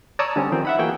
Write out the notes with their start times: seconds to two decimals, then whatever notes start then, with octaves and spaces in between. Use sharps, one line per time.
0.19 C#5 D5 A5 A#5 D#6 E6
0.36 D3 G3 C4 C#4
0.52 D#3 F3 C4
0.65 E5 F#5 B5
0.79 E3 A#3 F#4 G#4 G5